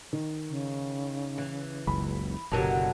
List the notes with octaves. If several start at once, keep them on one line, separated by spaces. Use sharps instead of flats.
D#3
C#3
E3
F#1 C#2 B5
F#1 B2 D3 F#3 G4 A#4 A5